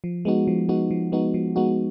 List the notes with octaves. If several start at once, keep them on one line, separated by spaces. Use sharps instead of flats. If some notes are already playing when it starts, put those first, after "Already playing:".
F3
G#3 B3 D#4 F#4
F3
G#3 B3 D#4 F#4
F3
G#3 B3 D#4 F#4
F3
G#3 B3 D#4 F#4